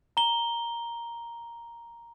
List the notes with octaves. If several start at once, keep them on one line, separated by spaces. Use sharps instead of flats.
A#5 G7